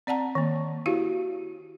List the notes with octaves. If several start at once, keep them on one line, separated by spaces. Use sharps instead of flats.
C4 D5 F#5 A5 A#5
D#3 A#3
E4 F#4 G4 F5